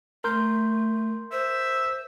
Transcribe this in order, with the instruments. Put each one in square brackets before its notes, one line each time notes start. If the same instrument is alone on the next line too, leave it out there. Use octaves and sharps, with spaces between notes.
[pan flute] A3 [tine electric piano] A#4 C6 G6
[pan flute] C5 [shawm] E5